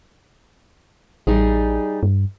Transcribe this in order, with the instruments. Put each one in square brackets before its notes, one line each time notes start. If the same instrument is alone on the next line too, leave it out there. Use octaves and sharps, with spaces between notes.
[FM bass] A1 [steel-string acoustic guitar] G3 D#4 G#4
[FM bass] G2